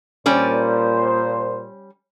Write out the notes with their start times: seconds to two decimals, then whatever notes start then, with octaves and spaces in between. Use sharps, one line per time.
0.26 A#2 G3 C#4 C5 D5